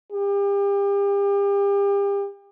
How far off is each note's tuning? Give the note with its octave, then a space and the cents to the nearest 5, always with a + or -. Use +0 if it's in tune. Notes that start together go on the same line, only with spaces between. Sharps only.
G4 +35